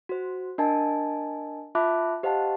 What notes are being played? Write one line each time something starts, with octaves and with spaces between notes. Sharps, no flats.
F#4 C5
D4 A#4 D#5 G#5 A5
F4 E5 A5 B5 D6 F#6
G4 C5 D#5 F5 F#5 A5